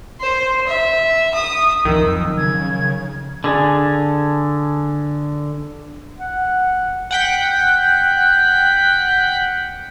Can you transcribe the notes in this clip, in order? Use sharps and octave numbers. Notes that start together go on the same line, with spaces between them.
C5
E5
D#6
F2 D#3 F3 F#3 E6
C#3 G#6
D3 G#4 A4
F#5
F#5 G5 B6